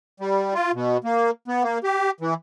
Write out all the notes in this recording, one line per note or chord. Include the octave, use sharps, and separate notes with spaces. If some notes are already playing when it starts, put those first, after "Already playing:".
G3
F4
B2
A#3
B3
A#3
G4
E3